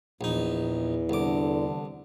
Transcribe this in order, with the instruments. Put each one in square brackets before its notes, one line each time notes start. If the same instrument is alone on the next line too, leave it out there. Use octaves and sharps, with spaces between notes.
[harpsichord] A#1 D#4 [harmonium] E2
[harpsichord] C2 D6 [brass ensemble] D3